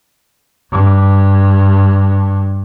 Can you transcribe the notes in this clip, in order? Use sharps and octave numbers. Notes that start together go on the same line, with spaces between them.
G2